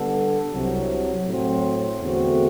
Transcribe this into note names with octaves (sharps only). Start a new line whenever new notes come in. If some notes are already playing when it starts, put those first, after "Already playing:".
Already playing: D3 G3 B3 D4 A4
C2 C3 F#3
A2 F#3 C4
E2 D3 A3 C4 F#4